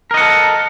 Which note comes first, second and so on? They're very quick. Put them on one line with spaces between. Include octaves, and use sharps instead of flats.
A#4 D#5 F#5 A4